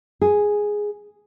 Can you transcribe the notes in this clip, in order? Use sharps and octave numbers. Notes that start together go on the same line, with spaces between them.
G#4